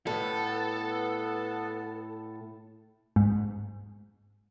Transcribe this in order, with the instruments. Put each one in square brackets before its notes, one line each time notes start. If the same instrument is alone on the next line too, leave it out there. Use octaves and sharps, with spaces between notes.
[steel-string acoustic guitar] A2 [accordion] B3 [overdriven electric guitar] A4
[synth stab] G#2